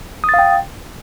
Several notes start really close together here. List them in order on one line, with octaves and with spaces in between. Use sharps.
D#6 A6 F5 G5